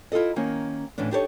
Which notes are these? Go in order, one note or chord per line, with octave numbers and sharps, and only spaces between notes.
E4 F4 G#4 A4 D#5
D#3 A#3 C#4
A2 D3 E3 C#4 D4
D4 D#4 G4 A4 A#4 C#5